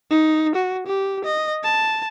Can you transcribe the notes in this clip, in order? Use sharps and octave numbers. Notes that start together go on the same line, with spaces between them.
D#4
F#4
G4
D#5
A5